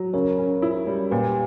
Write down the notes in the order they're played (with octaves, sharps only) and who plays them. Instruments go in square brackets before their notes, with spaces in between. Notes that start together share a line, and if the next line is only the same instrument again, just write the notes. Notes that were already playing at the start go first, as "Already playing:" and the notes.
Already playing: [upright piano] F#3
[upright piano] C#3 [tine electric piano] A#4 C#5
[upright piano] C#4
E4
G3
[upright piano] A#2 [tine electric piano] G4 B4